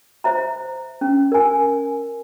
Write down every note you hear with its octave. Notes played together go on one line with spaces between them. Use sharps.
C5 E5 A#5
C#4
A#4 G#5